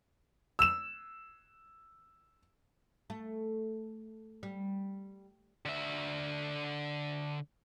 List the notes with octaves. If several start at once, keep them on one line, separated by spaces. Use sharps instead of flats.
E6 E7
A3
G3
D3 E5